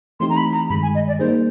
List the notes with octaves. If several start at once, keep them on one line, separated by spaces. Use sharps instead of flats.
E3 A3 C4 D#4 G4 C6
A#5
B5
A#5
G2 D#3 G#3 B5
G#5
D#5
D5
G3 A#3 D#4 G#4 C5